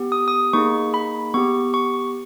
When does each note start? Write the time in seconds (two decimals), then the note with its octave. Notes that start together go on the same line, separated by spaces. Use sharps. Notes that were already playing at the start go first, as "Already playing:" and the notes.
Already playing: B3 G4
0.12 D#6
0.28 D#6
0.53 A#3 D#4 G#4 C#6
0.94 B5
1.34 B3 G4 C#6
1.74 C#6